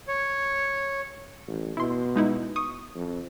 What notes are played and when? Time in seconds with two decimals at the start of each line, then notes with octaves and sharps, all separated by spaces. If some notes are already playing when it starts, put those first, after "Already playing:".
0.08 C#5
1.47 A1
1.77 B2 E4 C6
2.16 G#3 D#4 E4
2.56 C#6 D#6
2.95 F2